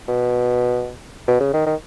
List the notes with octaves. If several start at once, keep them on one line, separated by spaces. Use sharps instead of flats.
B2
B2
C#3
D#3
D#3